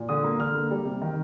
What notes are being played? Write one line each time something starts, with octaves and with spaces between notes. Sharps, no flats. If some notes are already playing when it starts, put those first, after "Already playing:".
Already playing: A#2
D3 D#6
A#3
D3 F6
A#3
G3
C3
D#3